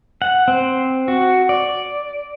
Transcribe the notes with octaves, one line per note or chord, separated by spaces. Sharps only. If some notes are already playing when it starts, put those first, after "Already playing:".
F#5
C4
F#4
D5